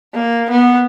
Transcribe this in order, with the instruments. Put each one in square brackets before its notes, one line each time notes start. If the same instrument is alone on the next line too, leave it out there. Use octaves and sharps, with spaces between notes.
[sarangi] A#3
B3